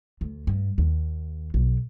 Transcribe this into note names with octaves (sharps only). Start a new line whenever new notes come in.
D2
G2
D#2
B1